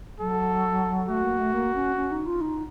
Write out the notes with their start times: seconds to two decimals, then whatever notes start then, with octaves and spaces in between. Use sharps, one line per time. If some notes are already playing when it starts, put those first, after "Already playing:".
0.20 F#3 A4
1.09 A3 F#4
1.23 A#3
1.38 A3
1.53 A#3
1.75 C#4
1.96 C#4
2.11 D#4
2.26 F4
2.41 D#4